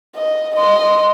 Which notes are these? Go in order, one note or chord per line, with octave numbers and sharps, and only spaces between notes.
D#5
D#5 C6